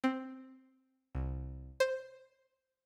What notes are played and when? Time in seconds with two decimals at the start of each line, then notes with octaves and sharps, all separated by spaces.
0.04 C4
1.15 C2
1.80 C5